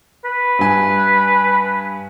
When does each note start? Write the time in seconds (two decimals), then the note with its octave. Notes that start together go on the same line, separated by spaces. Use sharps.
0.25 B4
0.59 G2 G#5